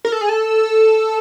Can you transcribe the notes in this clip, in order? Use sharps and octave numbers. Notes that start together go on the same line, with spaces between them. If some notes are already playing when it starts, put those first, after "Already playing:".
A#4
A4
G#4
A4